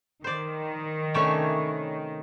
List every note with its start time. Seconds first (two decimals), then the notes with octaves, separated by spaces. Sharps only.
0.24 D#3 C5 D5
1.14 C3 A3 C#4 D4 E4 C#5